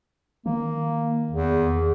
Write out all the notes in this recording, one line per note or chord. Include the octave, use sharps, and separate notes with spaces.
D#3 A#3
E2